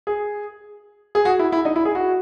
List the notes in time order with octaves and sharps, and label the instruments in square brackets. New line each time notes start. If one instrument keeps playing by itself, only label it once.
[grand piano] G#4
G#4
F#4
E4
E4
D#4
E4
G#4
F#4